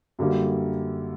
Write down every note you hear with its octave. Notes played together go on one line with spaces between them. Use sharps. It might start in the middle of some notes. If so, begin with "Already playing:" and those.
F#2 D3 G3 A#3